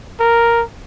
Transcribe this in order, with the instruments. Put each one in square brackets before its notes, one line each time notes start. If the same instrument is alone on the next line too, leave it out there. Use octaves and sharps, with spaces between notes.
[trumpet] A#4